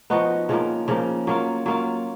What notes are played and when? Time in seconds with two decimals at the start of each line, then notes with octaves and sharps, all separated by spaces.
0.10 F3 B3 D#4 F#4
0.49 C#3 F3 A#3
0.88 C#3 F3 A#3
1.27 F#3 A#3 F4
1.66 F#3 A#3 F4